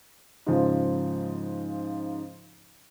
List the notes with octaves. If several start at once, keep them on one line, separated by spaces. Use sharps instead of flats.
G#2 C#3 F3